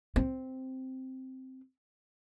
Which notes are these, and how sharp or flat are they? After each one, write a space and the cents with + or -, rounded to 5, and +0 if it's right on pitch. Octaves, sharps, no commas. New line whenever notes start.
C4 -5